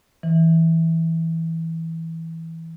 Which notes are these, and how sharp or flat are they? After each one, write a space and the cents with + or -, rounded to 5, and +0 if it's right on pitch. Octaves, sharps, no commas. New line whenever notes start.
E3 -10